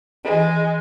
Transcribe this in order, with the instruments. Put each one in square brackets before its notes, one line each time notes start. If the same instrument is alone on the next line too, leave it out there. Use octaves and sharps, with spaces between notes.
[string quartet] E3 G#3